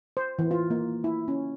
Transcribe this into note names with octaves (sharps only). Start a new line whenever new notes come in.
C5
E3
F4
A#3
E4
C#4